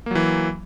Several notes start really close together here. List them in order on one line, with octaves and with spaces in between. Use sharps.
A#3 F#3 E3